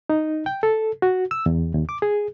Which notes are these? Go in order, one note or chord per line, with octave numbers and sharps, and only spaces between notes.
D#4
G5
A4
F#4
E6
E2
D#2
D6
G#4